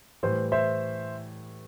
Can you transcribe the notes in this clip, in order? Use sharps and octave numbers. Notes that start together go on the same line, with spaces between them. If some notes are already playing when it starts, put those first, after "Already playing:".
A2 E3 G3 C5
C5 E5